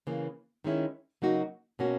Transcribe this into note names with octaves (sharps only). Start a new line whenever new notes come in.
C#3 E3 A#3
D#3 G#3 C#4 E4
C#3 F#3 A#3 D#4 F#4
B2 A#3 C#4 F#4